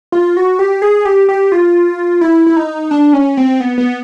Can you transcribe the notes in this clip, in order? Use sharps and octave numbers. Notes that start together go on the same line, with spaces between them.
F4
F#4
G4
G#4
G4
G4
F4
E4
E4
D#4
D4
C#4
C4
B3
B3